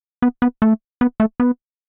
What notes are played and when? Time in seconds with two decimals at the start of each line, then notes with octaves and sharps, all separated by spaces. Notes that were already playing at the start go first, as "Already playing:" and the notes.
0.22 B3
0.42 B3
0.62 A3
1.01 B3
1.20 A3
1.40 B3